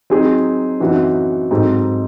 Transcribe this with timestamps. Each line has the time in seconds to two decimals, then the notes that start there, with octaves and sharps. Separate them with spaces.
0.10 F#3 C4 D#4 G#4
0.80 F#2 E3 C4 D#4 F#4
1.51 G#2 F#3 C4 D#4 A4